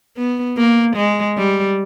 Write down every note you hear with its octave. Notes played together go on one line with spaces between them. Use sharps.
B3
A#3
G#3
G3